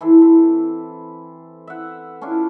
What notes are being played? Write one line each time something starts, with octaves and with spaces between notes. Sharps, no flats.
E3 E4 A4 C5
C4 E4
E5 F#5
C#4 D4 E4 F4